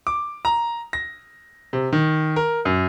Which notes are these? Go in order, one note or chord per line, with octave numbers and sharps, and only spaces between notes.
D6
A#5
A#6
C3
D#3
A#4
F#2